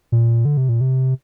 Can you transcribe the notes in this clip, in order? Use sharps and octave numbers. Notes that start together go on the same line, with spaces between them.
A#2
D3
C3
A#2
C3